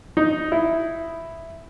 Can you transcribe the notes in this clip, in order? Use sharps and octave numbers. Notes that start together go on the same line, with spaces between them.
D#4
E4